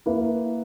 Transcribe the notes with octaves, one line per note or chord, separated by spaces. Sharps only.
A#3 E4 B4